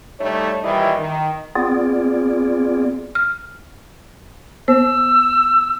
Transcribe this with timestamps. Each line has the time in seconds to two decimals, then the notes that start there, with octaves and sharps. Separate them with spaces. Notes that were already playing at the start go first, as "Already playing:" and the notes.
0.20 G3 A3 D4 D#4 C#5
0.64 A#2 D#3 E3 G3 E4 D#5
0.98 D#3
1.55 B3 C4 F4 G#4 D5
3.15 F6
4.68 B3 C5 E6